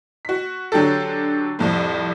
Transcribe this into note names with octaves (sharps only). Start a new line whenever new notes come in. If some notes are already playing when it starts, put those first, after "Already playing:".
F#4 B6
D3 F#3 D4 G4 A4
C2 F2 A2